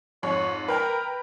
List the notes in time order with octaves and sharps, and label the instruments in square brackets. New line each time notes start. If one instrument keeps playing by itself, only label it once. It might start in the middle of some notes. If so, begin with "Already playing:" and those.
[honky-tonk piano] F2 G#2 [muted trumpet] C#5
[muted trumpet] A#4 [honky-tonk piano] B4 G5 A#5